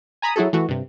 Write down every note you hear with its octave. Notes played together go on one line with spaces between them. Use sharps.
G#5 A#5 B5 D#6
F#3 E4 F#4 G#4 A4
E3 A3 F#4
G2 C3